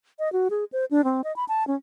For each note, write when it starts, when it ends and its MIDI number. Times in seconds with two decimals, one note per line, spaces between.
0.19 0.32 75
0.33 0.48 66
0.50 0.64 68
0.73 0.85 72
0.91 1.04 62
1.04 1.21 60
1.24 1.34 75
1.36 1.45 83
1.48 1.66 81
1.67 1.75 61